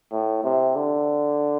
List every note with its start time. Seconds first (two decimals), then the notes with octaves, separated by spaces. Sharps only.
0.11 A2
0.44 C3
0.76 D3